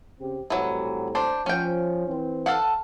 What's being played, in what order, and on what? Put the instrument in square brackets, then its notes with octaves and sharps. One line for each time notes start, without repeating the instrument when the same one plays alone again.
[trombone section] C#3 C4 G4
[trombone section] A2 G3 C4 [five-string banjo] E3 F#3
[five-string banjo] D4 C5
[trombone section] F3 [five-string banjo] C#4 G5
[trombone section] E3 C4
[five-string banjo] A4 F5 F#5